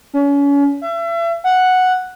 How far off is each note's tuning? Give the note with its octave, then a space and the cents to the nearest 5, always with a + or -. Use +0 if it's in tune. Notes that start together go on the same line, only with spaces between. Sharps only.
C#4 +35
E5 +35
F#5 +0